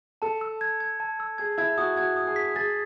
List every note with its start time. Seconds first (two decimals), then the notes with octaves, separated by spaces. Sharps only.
0.22 A4 A5
0.41 E6
0.61 G#6
0.80 G#6
1.00 A5
1.20 E6
1.38 G#4 G#6
1.58 E4 G#6
1.77 F#4 D#6
1.97 F#4 G#6
2.17 D#6
2.27 G#4
2.36 B6
2.55 G#4 A6